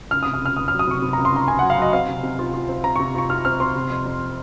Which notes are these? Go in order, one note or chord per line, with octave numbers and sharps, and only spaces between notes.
C#2 F6
D#6
C3
D#6
C#2 F6
C#2 D#6
F#3 F6
D#6
C3 C#6
C3
C#2 A#5
C6
C#2 A#5
C#2 G#5
F#3 F#5
F5
F#3 D#5
C4 F5
C3
C3
F4
F4
C4
C4 A#5
C3 C#6
F4 C#6
F4 F6
C4 F6
C4 C6
C3
F2
F2